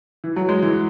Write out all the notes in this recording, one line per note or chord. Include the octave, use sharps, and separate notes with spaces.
E3
F#3
G#3
E3